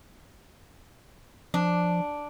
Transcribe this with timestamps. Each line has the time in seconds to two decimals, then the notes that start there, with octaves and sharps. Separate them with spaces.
1.54 F3 D4